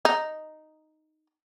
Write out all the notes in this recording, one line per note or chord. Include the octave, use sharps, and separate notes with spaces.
D#4